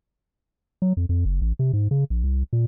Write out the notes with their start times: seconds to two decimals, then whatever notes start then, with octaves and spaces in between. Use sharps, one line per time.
0.82 F#3
0.97 F2
1.09 F2
1.25 F#1
1.41 A1
1.59 C3
1.73 G#2
1.91 C#3
2.10 A#1
2.24 C2
2.53 A#2